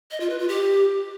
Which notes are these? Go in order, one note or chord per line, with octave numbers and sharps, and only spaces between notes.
D#5
F4
B4
F4
G4